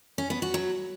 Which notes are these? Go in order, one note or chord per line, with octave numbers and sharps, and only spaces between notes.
C#4
B3
F#4
F#3